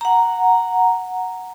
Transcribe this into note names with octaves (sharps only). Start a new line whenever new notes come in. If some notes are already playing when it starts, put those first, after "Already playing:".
F#5 A#5